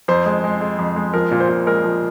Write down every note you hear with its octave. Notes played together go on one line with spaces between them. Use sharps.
F2 C5
G#3
G#3
G#3
F2
G#3
F3 A#4
A#2
C5
A#2
G#3 A#4
F3